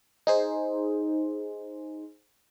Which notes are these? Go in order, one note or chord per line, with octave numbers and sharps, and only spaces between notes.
D#4 G#4 C5